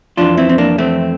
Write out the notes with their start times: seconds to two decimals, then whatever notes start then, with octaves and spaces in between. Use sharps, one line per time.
0.17 F2 E3 D4 F4
0.37 C4 E4
0.49 C4
0.58 A#3 D4
0.78 A3 C4